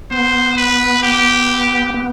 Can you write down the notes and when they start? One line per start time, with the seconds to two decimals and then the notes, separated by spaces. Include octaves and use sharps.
0.11 B3 C5
0.57 B4
1.03 G4
1.94 B3